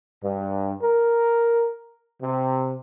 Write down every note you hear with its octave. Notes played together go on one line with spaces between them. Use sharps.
G2
A#4
C3